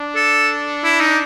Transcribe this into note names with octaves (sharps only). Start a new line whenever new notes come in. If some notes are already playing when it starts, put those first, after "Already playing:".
Already playing: D4
A4
E4
D#4